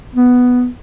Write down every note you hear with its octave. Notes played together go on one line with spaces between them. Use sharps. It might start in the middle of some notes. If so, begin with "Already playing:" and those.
B3